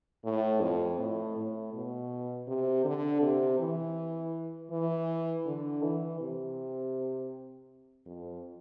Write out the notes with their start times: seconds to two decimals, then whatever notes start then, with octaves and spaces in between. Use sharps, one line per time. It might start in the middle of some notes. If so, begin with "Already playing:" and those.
0.25 A2
0.61 F2
0.99 A2
1.36 A2
1.74 B2
2.48 C3
2.85 D3
3.22 C3
3.59 E3
4.71 E3
5.46 D3
5.83 E3
6.20 C3
8.06 F2